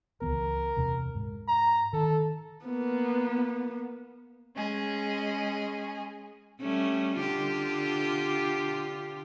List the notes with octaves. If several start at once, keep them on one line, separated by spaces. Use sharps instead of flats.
C#2 E3 B3 A#4
E2 C3
G#2
A#5
D#3 A4
A#3 B3
G#3 C#4 G#4 D#5
G3 A3 C#4
D3 F4 G4